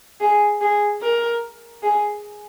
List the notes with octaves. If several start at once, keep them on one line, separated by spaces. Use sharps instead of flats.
G#4
G#4
A#4
G#4